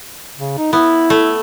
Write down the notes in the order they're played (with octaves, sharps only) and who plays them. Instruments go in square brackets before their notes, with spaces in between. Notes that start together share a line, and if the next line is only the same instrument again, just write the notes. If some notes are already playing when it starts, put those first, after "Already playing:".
[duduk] C#3
D#4
[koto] B3 [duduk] E4
[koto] A3